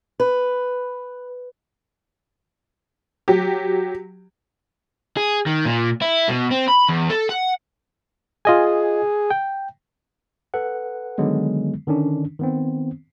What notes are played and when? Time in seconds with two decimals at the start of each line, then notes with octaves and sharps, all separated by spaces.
0.20 B4
3.28 F#3 G4
5.17 G#4
5.46 D#3
5.66 A#2
6.02 E4
6.29 B2
6.51 C4
6.69 B5
6.89 E2
7.10 A4
7.29 F#5
8.45 F4 G#4 D#5 G#5
9.31 G5
10.54 A4 B4 F#5
11.18 D3 D#3 F#3 G#3 B3
11.87 D3 D#3 C#4 D4
12.39 D#3 B3 C4